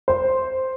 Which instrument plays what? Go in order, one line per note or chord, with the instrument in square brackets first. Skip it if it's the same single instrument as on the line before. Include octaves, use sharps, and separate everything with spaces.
[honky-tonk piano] C5